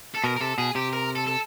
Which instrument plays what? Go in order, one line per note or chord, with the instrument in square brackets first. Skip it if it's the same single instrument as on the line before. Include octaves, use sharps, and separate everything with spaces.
[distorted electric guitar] A4
[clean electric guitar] B2 [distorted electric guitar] A#4
[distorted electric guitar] A#4
[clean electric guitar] C3 [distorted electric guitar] A4
[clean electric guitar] B2 [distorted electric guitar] G#4
[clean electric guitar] C3 [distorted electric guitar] G4
[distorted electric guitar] A#4
A4
A4